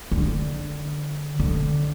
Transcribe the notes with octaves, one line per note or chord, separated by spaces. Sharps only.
D3
D3